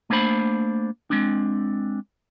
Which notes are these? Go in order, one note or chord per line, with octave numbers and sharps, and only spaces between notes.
A3 A#3 D4 C5 B5
G#3 C4 D4